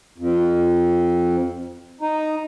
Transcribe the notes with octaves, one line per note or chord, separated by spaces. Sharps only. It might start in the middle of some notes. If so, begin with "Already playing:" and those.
F2
D#4